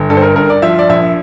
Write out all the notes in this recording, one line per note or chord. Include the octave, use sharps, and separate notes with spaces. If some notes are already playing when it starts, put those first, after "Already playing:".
Already playing: G1
G2 A4
C5
A#4
G2 A#4
D5
F3 E5
D5
A#1 E5